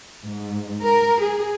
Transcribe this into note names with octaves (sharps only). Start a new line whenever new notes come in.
G#2
A#4
G#4